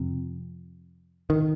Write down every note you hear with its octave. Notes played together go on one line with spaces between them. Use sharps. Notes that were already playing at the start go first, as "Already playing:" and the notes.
Already playing: F2 C3
D#3